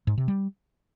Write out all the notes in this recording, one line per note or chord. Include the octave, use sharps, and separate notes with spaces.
G#2
C3
G3